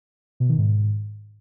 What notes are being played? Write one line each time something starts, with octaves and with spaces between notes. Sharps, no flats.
B2
D#3
G#2